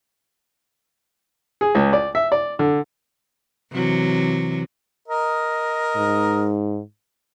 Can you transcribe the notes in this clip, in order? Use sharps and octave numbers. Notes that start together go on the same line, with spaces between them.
G#4
C#2
D5
E5
D5
D3
C3 E3 F#3
A#4 D#5
G#2